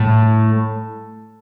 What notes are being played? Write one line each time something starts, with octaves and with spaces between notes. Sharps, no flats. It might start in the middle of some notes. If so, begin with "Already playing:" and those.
Already playing: A2